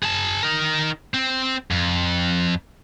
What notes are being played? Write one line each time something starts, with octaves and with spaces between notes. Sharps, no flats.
G#4 A5
D#4 A#4
C4
F2